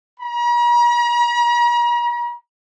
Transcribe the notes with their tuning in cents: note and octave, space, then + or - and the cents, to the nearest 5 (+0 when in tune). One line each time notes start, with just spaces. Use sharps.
A#5 +45